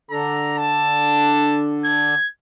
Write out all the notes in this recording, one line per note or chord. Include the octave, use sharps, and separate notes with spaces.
D3 D4 A4 A#5
A5
G#6